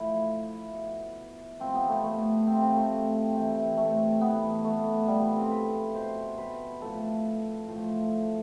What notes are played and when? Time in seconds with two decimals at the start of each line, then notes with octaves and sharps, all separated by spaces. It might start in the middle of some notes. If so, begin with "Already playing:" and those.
Already playing: A2 F3 E4
0.73 B2
1.60 C3 F3 C4
1.75 B3
1.89 A3
2.04 A3
2.47 C3 F3 C4
2.62 C4
2.76 A3
3.34 C3 E3
3.77 A3
4.21 A2 E3 B3
4.64 A3
5.08 A2 F3 G3
5.36 C4
5.51 B4
5.94 B2 C5
6.38 B4
6.81 A2 F3 A4
7.68 A2 F3